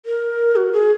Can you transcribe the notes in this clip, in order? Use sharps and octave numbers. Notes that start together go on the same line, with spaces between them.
A#4
F#4
G#4